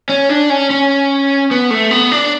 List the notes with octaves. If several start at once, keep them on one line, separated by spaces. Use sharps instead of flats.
C#4
D4
C#4
C#4
B3
A3
B3
D4